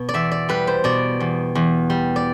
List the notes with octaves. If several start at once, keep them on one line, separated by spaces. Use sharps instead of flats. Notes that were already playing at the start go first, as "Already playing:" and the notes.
Already playing: B2
D5
E2 E5
D5
G3 B4
C5
B2 D5
E2
E2
G3
D5